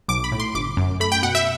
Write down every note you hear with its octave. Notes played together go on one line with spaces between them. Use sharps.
B1 D6
B5
A2
C6
G1 D6
F#2
A3 B5
G5
B2 F#5
E5